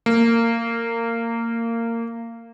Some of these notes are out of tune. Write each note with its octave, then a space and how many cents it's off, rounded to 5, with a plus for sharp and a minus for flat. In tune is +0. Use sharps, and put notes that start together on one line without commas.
A#3 -20